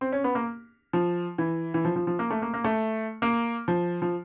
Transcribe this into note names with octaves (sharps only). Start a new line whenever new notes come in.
C4
C#4
B3
A#3
F3
E3
E3
F3
F3
F3
A#3
A3
A#3
A#3
A3
A#3
F3
F3